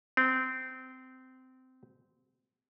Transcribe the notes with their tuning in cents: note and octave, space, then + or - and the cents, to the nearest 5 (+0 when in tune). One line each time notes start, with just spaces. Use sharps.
C4 -20